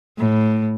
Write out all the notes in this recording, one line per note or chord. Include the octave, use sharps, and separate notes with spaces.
A2